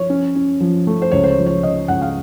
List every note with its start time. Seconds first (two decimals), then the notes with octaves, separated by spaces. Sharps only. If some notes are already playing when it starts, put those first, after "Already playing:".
Already playing: F3 C#5
0.10 C#4
0.36 C#4
0.60 F3
0.87 A3
1.02 C5
1.12 C#2 C#5
1.24 C5
1.29 C#5
1.37 F3
1.46 C#5
1.63 C#3 D#5
1.88 C#2 F#5
2.02 F5